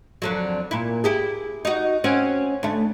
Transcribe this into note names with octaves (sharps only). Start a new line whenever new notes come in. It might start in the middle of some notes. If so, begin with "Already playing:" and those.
F2 D3 F#3
A#2 E4
E4 G4 G#4
D#4 F#4
C4 C#4 F#4
D2 A3